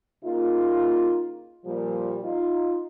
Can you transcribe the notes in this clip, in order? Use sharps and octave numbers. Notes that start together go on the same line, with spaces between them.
C#3 A#3 D#4 F4
A#2 F3 G3
D#4 F4